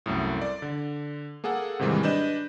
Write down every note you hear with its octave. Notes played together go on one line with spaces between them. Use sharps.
C2 F#2 A2
D5
D3
A#3 G#4 A4 F#5
G#2 C3 D#3 E3 G3 G#3
D4 B4 D#5 G6 E7